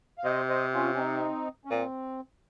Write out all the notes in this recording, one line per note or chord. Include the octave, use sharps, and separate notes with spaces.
F5
C3 C5 D#5
C5 D#5
C#4 F4
C#4
C4 D#4
C#4
A#2 C4